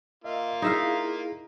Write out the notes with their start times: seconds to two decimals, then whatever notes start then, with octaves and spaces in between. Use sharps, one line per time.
0.24 A#3 F4 D#5 E5
0.62 D#4 E4 G#4 E5 F5